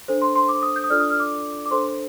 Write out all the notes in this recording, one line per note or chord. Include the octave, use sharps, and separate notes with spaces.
D4 A4 C5
C6
C6
D6
D#6
G6
D#6
D4 F4 A4 D5 F6
D#6
F6
D6
D6
D4 A4 C5 C6